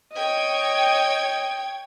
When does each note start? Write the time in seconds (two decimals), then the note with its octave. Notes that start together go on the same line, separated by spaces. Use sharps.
0.15 C#5 D#5 G5 G#6